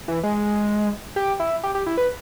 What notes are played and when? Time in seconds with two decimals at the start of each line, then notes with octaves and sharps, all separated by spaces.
0.08 E3
0.23 G#3
1.16 G4
1.40 E4
1.64 G4
1.75 G4
1.86 E4
1.97 B4